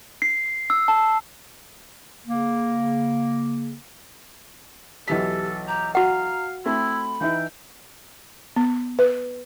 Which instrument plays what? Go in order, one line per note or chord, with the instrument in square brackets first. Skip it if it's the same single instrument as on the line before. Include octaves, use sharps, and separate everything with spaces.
[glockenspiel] C7
E6
A5
[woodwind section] C#3 A#3
[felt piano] B1 E3 B6 [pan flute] G4 [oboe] A4
[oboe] G4 [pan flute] A#5
[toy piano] F#4 F#5 [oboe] F5 [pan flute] A#5
[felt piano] A3 C4 [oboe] E4 [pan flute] B5
[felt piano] E3 D#4 E5 [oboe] G5
[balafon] B3
B4